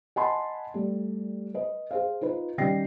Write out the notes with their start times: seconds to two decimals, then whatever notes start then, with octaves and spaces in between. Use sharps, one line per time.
0.16 D#5 F#5 G#5 A5 B5 C6
0.74 G3 A3
1.54 B4 D#5
1.91 G#4 C5 F5
2.21 D#4 F4 B4
2.58 D#3 G3 C#4 G5 A#6 C7